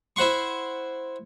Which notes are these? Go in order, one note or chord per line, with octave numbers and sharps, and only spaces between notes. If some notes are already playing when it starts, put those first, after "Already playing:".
E4 C5 F#5 C6 C#6